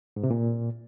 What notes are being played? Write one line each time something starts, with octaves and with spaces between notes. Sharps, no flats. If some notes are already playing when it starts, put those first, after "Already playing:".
G#2
C3
A#2